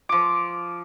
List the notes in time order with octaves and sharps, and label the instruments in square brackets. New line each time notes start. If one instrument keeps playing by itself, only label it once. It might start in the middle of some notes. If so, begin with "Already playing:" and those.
[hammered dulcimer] F3 D6